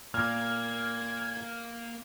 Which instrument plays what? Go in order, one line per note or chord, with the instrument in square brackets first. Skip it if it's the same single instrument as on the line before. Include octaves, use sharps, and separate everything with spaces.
[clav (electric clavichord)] A#2 [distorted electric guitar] A#3 [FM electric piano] F6 [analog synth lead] G#6